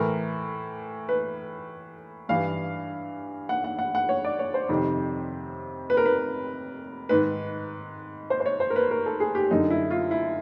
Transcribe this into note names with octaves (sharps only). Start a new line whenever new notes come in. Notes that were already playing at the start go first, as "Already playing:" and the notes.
Already playing: A2 E3 A#4
B4
G2 E3 F5
F#5
F#5
F#5
F#5
C#5
D5
C#5
C5
F2 C3 D#3
B4
A#4
B4
G#2 D#3 B4
C5
C5
C#5
C5
A#4
B4
A#4
A4
G#4
G4
F#2 D3 D#4
E4
F4
E4